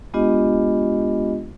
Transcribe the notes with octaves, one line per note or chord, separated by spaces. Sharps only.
G#3 B3 D4 F4 G4 D#5